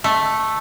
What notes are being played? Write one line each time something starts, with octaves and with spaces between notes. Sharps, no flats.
A3